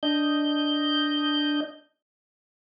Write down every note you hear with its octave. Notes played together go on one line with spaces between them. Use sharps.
D4 D#5 G6